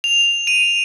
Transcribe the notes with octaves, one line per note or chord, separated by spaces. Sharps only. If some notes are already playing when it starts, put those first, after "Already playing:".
F7
D#7